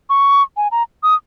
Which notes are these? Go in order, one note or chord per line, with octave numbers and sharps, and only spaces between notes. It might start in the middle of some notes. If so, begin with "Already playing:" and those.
C#6
G#5
A#5
D#6